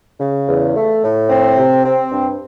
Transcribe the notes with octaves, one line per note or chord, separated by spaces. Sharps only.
C#3
E2
A3
A2
C4
C3
C4
G2